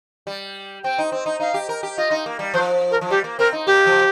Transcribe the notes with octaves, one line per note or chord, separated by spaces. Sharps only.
G3
C4 G5
D#4
C4
D#4
D#4 F5
G4
A#4
G4
F4 D#5
D#4
A#3
G3
F3 C5
A#4
F3
G3 G4
A#3
C4 A#4
D#4
A#3 G4
F3